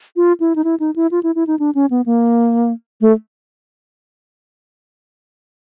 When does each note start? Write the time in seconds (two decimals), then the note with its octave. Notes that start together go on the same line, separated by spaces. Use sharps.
0.16 F4
0.40 E4
0.56 D#4
0.64 E4
0.80 D#4
0.96 E4
1.11 F4
1.23 E4
1.35 E4
1.47 D#4
1.59 D4
1.75 C#4
1.90 B3
2.06 A#3
3.01 A3